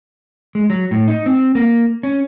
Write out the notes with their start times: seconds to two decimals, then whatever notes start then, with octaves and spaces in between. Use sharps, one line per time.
0.55 G#3
0.70 F#3
0.91 A2
1.08 D#4
1.26 C4
1.55 A#3
2.03 C#4